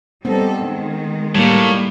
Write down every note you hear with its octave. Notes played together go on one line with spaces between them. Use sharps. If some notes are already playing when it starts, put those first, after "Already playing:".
G3 B3 C4 D#4 A4
D#3 G#3
A2 G3 A#3